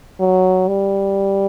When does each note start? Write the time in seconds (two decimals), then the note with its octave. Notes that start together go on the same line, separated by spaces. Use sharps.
0.20 F#3
0.68 G3